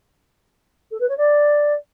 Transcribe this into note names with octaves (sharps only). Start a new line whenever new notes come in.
A4
B4
C#5
D5